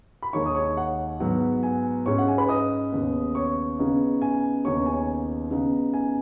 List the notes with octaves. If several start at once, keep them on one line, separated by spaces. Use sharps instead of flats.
B5
D#2 D#3 G#3 D#4 C#5 C#6
D#6
C#5 C#6
F#5
G#2 F#3 B3
G#5
G#2 G#3 C#4 C#5 C#6
F#5
G#5
B4 B5
D#5 D#6
D#2 C#3 B3
C#5 C#6
C#3 B3 D#4
G#5
D#2 C#3 B3 D#4 C#5 C#6
G#5
C#3 B3 D#4
G#5